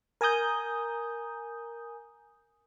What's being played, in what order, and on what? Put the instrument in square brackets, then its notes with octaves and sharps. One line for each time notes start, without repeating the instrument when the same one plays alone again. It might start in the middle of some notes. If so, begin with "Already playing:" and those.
[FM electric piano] A#4 G#5 A#5 D#6 G6